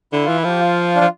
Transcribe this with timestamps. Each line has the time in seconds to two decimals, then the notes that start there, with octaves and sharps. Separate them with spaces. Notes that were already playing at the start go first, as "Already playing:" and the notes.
0.13 D3 E4
0.24 E3 F4
0.36 E4
0.44 F3 G4
0.59 F4
0.96 D4
1.01 F3